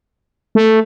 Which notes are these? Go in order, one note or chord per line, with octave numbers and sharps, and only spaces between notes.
A3